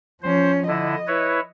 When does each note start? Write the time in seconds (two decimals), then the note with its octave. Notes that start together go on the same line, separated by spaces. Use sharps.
0.23 F3 C#4 C5
0.68 D3 E4 D#5
1.07 E4 B4 C#5